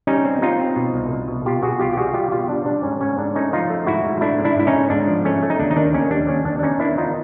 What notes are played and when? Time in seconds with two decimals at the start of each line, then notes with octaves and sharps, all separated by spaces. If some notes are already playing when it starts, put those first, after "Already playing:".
0.07 G3 C#4 D#4
0.25 C4
0.42 C4 D#4 F4
0.59 C4
0.76 B2
0.94 C2
1.12 C2
1.28 B2
1.45 B2 F4 G4
1.63 B2 F#4 G#4
1.80 C2 F4 G4
1.93 G4
1.97 G3 F#4 G#4
2.14 G3 F4 G4
2.32 B2 F4 G4
2.49 G3 D4
2.66 G3 D4
2.83 G#2 C#4
3.01 G#2 C#4
3.18 G#2 D4
3.35 A3 C#4 D#4
3.53 F3 D#4 F4
3.70 A3
3.87 G#2 E4 F#4
4.04 G#2
4.21 A3 D4 E4
4.39 G#2
4.45 D4 E4
4.57 G#2 E4
4.67 C#4 D#4
4.73 G#2
4.90 G#2 D4
5.07 F3
5.25 A3 C#4
5.43 A3
5.50 D#4
5.60 D#2 D4
5.71 D#4
5.76 D#3 D4
5.94 D#2 C#4
6.11 G3 D4
6.28 D#2 C#4
6.45 D#2 D4
6.59 D4
6.63 B3 C#4 D#4
6.80 D#3 D4 E4
6.98 B3 D#4 F4